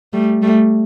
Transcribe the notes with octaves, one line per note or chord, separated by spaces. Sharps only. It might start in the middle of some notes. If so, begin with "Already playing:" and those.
G3 A3
G3 A3